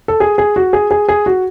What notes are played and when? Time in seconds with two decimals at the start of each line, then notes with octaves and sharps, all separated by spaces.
0.08 A4
0.20 G#4
0.38 G#4
0.56 F#4
0.73 G#4
0.91 G#4
1.09 G#4
1.26 F#4